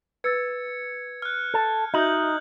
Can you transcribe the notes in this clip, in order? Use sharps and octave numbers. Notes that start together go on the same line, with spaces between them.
B4 E6 G#6 A6 C#7
F6 F#6
A4
D#4 F#4 D#5 E5 G6 F#7